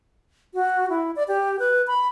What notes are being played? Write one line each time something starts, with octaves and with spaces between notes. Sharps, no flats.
F#4
E4
D5
G4
B4
B5